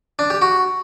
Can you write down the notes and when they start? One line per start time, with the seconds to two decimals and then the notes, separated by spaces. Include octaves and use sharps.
0.19 D4
0.30 G4
0.42 F#4